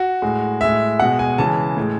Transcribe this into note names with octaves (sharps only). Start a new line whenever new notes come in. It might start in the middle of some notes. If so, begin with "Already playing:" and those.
Already playing: F#4
A2 G#3
A2 G#3 E5
B2 G#3 F#5
G#5
C#3 E3 G#3 A5
A2 G#3